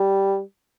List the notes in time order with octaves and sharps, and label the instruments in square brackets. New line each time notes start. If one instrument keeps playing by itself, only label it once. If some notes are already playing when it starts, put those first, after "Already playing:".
Already playing: [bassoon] G3